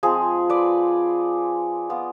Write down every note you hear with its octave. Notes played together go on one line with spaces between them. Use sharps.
F3 G#3 C4 G#4
B4 D5
B3 F4